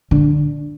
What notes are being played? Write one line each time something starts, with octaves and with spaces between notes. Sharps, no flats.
D3